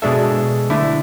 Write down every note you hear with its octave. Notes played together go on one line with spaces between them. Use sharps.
B2 G#3 D4 A4 E5
D3 A3 E4